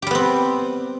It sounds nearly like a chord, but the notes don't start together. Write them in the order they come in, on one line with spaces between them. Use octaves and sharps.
G4 G3 B3 C4